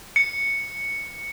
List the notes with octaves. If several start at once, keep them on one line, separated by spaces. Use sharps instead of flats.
C#7